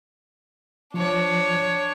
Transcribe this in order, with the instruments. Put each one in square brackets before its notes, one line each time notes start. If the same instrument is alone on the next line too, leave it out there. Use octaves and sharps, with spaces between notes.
[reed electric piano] F3 [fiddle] D4 C#5